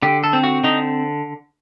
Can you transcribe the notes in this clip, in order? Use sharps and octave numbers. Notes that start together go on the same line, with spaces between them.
D3 G4
A4
C4
F#4
D3 D#4